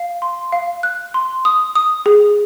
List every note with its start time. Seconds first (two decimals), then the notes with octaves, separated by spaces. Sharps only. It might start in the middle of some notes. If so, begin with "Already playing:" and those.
Already playing: F5
0.22 C6
0.52 F5
0.83 F#6
1.14 C6
1.45 D#6
1.75 D#6
2.06 G#4